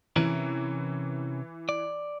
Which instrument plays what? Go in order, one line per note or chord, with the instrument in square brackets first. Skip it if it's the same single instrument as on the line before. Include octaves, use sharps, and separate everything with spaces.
[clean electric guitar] C3 C#4 A#4 [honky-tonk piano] E3
[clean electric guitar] D5